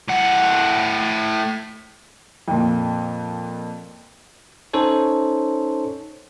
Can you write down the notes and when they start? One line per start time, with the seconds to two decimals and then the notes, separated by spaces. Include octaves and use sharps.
0.08 A2 F#5
2.48 F2 A#2
4.74 C#4 D#4 A4 C5 C#5